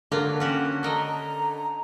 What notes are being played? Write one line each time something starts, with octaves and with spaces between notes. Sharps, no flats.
D3 F#3 A#3 F4
C#4 F#4 G4
A4 A#4 D#5 A#5